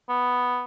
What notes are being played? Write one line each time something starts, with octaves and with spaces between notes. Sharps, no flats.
B3